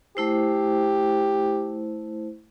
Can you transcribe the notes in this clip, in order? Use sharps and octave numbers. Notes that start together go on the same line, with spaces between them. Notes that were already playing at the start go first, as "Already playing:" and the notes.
A3 E4 G4 C5